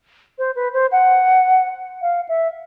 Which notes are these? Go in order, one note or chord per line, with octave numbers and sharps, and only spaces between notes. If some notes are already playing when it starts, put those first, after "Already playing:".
C5
B4
C5
F#5
F5
E5